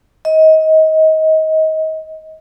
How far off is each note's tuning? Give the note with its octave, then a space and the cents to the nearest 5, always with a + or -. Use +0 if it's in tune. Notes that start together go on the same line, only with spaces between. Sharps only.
D#5 +25